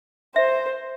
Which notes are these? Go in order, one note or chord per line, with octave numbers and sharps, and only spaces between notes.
C5 E5